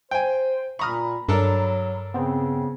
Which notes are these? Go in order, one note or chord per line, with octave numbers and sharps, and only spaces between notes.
C5 G5 G#5
A#2 A#5 B5 C#6 D#6 F6
G2 F#3 D4 A4 A#4
C#3 B3 C4